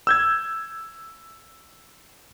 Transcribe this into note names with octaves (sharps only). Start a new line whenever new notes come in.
E6 G6 G#6